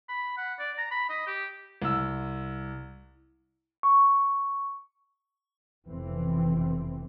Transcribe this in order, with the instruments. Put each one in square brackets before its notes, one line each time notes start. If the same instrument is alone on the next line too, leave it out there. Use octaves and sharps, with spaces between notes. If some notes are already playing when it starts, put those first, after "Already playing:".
[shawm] B5
F#5
D5
A#5
B5
D#5
G4
[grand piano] C2 E6
[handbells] C#6
[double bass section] F1 B2 E3 C4